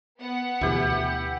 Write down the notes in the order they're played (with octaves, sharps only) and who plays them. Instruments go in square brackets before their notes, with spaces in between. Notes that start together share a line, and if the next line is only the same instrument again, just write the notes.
[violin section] B3 F#5
[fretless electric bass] D2 B2 E3 [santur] E4 G4